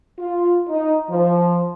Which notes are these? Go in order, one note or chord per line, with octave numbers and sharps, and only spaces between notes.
F4
D#4
F3